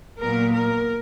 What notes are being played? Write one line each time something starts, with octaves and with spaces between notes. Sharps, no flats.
A#2 F#3 B3 A#4
A#4